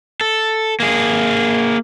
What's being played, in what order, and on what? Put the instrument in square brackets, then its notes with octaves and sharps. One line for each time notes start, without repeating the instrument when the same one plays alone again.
[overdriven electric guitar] A4
A#3 G#4